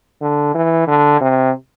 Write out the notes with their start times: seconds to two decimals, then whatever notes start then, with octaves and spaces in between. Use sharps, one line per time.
0.22 D3
0.55 E3
0.88 D3
1.21 C3